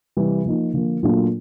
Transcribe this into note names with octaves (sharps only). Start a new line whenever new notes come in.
C3 E3 G3
F3 A#3 D#4
D3 F3 A#3
A#2 F#3 A3 D4 F4